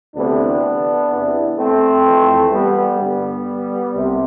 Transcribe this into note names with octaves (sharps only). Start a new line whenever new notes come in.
D2 C3 E3 B3 D4
E2 C3 E3
A3 C4
F2 E3
G3 B3
G2 D3 G3 B3
C2 C3